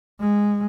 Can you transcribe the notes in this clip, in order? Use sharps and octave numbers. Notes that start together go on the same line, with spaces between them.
G#3